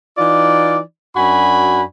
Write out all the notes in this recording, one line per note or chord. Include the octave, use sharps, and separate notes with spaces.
E3 D#4 F4 D5
F#2 D4 F#4 G#5 B5